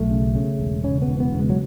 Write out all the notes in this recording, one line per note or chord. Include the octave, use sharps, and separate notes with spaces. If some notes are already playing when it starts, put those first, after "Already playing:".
Already playing: B1 A3
C#3
C#3
E1
C#3 C#4
B3
E1
B3
C#3
G#3
F#3